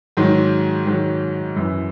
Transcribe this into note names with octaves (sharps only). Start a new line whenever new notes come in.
G#2 D#3 F#3
G#2 D#3 F#3
F#2 E3